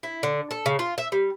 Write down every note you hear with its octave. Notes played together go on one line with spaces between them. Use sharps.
E4
D3
A4
C#3
F4
E5
G3